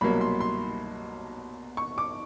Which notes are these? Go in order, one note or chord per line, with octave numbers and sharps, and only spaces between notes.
C2 B2 F#3 A#3 B5
C6
C6
C#6
D6